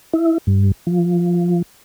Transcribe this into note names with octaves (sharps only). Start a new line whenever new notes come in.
E4
G2
F3